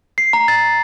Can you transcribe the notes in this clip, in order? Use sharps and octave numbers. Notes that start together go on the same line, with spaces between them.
C7
A#5
A6